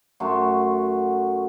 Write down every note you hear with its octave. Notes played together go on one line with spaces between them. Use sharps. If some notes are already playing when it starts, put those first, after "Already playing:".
F#2 A3 F#4 C6